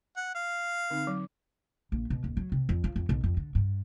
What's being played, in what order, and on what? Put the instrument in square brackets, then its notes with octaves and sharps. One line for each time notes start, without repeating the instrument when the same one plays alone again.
[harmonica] F#5
F5
[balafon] D3 C4 D#4
F#3
[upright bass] A#1
B2
D#1
F#3
C3
F2
F3
F2
B1
F2
D3
G2